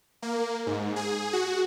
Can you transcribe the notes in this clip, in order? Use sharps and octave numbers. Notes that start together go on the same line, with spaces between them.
A#3
G#2
G#4
F#4